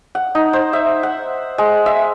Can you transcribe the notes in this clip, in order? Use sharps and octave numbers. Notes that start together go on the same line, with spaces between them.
F#5
D#4
C5
E5
F#5
G#3
E5